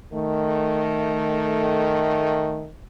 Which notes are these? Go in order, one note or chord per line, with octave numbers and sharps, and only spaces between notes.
D#3 A3